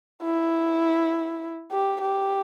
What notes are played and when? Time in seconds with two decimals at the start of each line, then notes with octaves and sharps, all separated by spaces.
0.23 E4
1.71 G4
2.01 G4